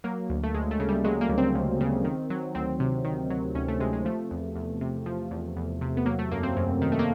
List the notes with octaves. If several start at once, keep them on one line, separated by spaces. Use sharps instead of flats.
F#3 A#3
D2
A3
D2 G#3
A3
C#3
G3
F#3 G#3
A#3
D2
C4
D2
C#3
D#3
F#3
D2 C4
C3
D#3
F#3
D2 C#4
A3
C3 G#3
G#3
F3 A3
E2
E2
C3
F3
E2
E2
C3
B3
F#3 A#3
A3
F#2 A#3
C4
F#2
D#3
A3
A#3